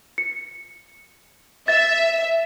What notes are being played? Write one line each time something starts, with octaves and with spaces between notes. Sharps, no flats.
C#7
E5 A6